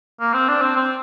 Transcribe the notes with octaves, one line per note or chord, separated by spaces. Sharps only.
A#3
C4
D4
C4
C4